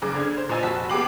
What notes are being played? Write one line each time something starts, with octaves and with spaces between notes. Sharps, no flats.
F#1 G#4 D6
D3 G#6
C5
A#2 C5 D#5 G#5 E6 A6
F1 F#4 A5 B6
B3 G4 G#4 D6 C7 F#7